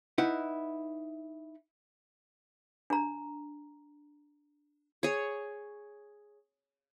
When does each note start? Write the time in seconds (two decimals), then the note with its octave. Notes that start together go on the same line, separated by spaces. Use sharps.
0.18 D#4 E4 B4 F#5
2.90 D4 A#5
5.03 G#4 C#5